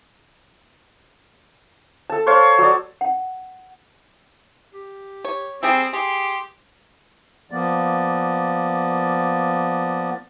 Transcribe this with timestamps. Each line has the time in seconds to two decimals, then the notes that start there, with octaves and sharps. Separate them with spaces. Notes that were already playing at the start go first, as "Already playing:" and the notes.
2.10 A4 A5
2.27 C5 C#5 F5
2.58 F#3 D5
3.01 F#5
4.73 G4
5.25 C#5
5.63 G3 C4 G4 G#4 E6
5.93 G4 G#4 C6
7.51 F3 A#3 B3 D5